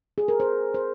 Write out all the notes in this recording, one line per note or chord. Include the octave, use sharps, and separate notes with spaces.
G#4
A#4
C5
C5